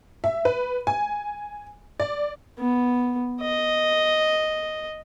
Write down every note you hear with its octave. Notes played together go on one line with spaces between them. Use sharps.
E5
B4
G#5
D5
B3
D#5